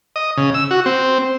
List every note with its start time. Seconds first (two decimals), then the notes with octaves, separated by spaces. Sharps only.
0.16 D#5
0.38 C#3
0.54 E6
0.71 F#4
0.86 C4